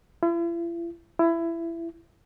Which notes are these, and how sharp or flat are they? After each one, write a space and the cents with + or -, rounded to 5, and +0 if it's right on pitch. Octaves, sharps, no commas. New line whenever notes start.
E4 +45
E4 +20